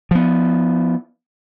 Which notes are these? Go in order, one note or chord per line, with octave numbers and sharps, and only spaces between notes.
F3 B3